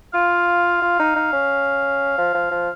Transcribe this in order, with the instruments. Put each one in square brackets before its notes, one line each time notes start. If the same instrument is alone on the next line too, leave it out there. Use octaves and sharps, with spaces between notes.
[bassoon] F4 [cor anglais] F5
[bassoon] F4
D#4
D#4
C#4
F3
F3
F3